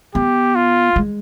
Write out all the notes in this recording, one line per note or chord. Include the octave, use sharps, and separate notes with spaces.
B3 G4
F4
G#3